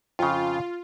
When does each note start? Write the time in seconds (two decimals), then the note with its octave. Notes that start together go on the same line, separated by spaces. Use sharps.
0.19 F2 C#3 F4